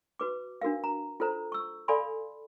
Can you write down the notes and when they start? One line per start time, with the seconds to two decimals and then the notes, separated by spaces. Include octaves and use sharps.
0.20 F#4 B4 D6
0.62 D4 F#4 A#4 F5
0.84 A#5
1.20 F4 A4 C5 A#5
1.52 C#6 E6
1.88 A4 D5 F5 G#5 B5 C6